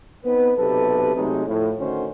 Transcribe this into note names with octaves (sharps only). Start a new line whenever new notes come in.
B3 C4 D#4 B4
B1 C3 G4 A4 B4
C3 F#3 G#3 A3 D#4
A2 F3
D2 D3 D#3 C#4 F#4 C5